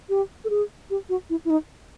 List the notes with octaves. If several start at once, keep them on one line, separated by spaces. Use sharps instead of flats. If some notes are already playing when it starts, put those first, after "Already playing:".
G4
A4
G#4
G4
F#4
E4
E4
D#4